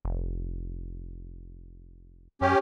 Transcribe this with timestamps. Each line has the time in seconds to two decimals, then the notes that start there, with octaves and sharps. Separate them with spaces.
0.05 F1
2.41 F#2 C#4 G4